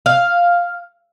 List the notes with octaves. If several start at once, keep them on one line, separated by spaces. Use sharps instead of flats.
F5